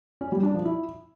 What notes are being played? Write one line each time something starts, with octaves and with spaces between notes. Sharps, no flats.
C#4
G3
D4
F3
E4